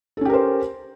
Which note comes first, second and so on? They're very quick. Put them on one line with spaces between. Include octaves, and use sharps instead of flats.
A4 C#4 G4 A#4 C5